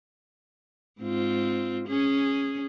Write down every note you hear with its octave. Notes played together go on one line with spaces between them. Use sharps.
G#2 C4 F4
C#4 G#4